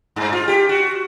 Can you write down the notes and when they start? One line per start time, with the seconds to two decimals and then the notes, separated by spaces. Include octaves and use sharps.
0.16 G2
0.33 F4
0.48 G4
0.69 F#4